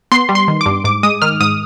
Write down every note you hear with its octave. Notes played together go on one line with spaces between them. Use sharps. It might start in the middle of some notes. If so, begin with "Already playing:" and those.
B3 C6
G3
C6
D#3
D6
G2
G#2 D6
G#3 D#6
D#3 F6
G#2 D#6